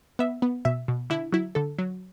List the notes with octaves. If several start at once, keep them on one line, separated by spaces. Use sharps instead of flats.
B3 E5
B3
B2 E5
B2
D3 E4
F#3 E4
D3 A4
F#3